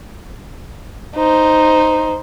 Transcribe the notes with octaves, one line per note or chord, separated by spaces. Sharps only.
D#4 C5